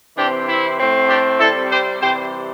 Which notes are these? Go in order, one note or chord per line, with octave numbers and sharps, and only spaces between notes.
C3 E3 C4 D4 G4
E4
A2 A3 C4
D4 G4
C3 G3 C4 E4 A4
G4 C5
C3 E3 G3 G4 C5